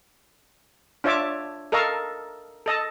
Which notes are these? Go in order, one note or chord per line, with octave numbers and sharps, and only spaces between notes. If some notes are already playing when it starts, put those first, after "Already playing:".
D4 F4 C#5 E5 A5 D6
A4 A#4 D#5 F5 A5 C#6
A4 D#5 A5